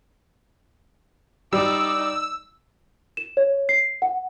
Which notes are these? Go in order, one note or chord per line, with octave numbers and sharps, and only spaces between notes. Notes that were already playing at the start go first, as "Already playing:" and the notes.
G3 D#4 D5 E6
E7
C#5
C7
F#5